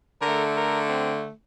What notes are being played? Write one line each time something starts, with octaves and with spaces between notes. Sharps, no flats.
D3 A3 A#4
A#4
C4